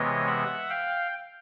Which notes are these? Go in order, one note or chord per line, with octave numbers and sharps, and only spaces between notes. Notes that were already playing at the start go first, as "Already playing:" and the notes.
Already playing: C3 E3 G#3 B3 C#5 D#5
E5 F#5
F5 G5